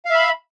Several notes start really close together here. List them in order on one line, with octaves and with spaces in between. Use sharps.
F5 E5 B5